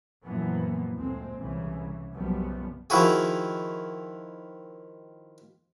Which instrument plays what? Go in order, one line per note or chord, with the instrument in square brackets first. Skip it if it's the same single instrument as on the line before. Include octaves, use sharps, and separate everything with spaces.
[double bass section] F#2 A#2 E3 F3 A#3 B3
D2 A#2 G#3 C4
C2 C#3 E3
B1 F#2 C#3 F3 G3 B3
[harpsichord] D#3 F3 E4 F#4 G#4